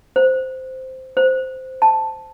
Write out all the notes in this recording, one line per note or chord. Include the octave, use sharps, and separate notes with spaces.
C5
C5
A5